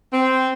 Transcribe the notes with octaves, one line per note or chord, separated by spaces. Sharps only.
C4